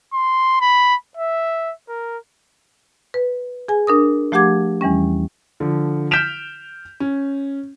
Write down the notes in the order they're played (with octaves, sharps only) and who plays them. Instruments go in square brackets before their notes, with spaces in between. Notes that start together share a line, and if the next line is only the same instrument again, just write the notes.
[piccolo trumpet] C6
B5
E5
A#4
[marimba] B4
G#4 G#5
D4 A#4 D#6
F3 A3 G4 F#5 D6 G#6
E2 E3 G3 C#4
[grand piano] D3 F3
F6 G6 B6 D7 E7 F7
C#4